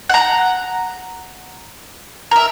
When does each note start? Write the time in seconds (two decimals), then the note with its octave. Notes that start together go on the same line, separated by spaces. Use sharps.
0.10 F#5 A#5
2.31 A#4 E5